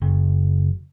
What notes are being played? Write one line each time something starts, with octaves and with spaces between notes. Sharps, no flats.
F#1